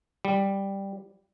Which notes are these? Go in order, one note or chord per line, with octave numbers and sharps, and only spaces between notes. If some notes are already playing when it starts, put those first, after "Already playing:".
G3